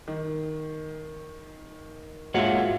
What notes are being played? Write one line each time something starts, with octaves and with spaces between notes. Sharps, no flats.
D#3
G#2 G#3 A#3 F4 F#4 C#5 E5 F#5